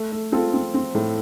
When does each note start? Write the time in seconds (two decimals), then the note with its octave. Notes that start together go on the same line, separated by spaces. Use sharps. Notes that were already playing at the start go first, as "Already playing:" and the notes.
Already playing: A3
0.12 A3
0.32 C4 F4 A4
0.53 C4
0.74 C4
0.95 A2